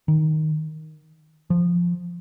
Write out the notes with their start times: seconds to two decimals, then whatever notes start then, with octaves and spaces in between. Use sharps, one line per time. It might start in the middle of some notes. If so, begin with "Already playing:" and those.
0.08 D#3
1.50 F3